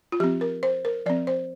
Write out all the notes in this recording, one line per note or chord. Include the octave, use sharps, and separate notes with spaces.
F4
F3 C4 G4
A#4
C5
A#4
F3 C4 D5
C5